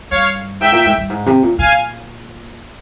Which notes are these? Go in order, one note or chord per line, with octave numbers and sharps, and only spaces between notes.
G2 C#5 F5
G#2 E5 G5
A#2
G#2
G2
G#2
C3
A#2
A#2 F5 G#5